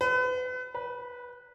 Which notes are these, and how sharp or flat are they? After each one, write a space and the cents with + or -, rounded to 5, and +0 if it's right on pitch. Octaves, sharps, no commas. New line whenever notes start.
B4 +35
B4 -15